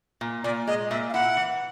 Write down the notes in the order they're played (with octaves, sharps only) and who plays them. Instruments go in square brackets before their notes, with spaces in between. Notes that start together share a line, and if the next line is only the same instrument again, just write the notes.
[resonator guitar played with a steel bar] A#2
[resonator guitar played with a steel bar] A#2 [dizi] D5
[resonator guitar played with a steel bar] G#3 [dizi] D#5
[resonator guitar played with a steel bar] A#2 [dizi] E5
[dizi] F5
[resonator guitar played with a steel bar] E4 [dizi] F#5
[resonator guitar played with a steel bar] E3